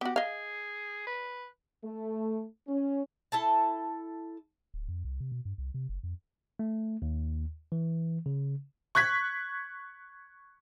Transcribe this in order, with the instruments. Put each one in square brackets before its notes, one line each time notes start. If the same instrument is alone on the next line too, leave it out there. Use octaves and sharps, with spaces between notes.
[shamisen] B3 F#4 [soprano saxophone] G4
[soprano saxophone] G#4 [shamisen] D#5 F5
[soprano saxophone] B4
[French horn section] A3
C#4
[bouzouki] E4 A4 A5
[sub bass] D1
F2
C2
C3
B2
G2
C2
C3
F#1
F2
[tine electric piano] A3
D#2
E3
C#3
[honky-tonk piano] C#6 F#6 G#6 B6